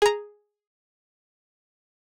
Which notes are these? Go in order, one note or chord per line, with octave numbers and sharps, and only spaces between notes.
G#4 A#5